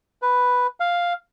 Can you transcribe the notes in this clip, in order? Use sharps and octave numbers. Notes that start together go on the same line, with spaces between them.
B4
F5